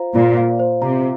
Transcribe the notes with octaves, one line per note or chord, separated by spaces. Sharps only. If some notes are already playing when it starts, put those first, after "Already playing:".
Already playing: F4 C5 F5 A#5
A#2 F4
F5
C5
C3 A#5